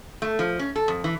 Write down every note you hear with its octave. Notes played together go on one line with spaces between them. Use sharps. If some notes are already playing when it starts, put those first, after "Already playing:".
A3
F3
C#4
A4
F2
E3